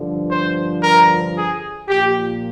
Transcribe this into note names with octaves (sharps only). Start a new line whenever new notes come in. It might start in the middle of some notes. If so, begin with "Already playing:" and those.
Already playing: G2 D3 F3
C5
A#4
G#4
A#2 F3 G4